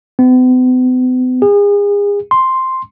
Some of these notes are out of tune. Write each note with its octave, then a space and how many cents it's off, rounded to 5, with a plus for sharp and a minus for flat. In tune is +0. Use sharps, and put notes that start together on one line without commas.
B3 +45
G#4 -35
C6 +0